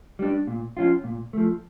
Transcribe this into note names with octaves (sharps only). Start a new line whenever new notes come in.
G3 D4
A#2
F3 C#4 F4
A#2
F3 A3